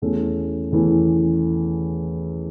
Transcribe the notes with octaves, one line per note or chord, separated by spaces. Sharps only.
E2 E3 A3 C#4
E2 E3 A3 C#4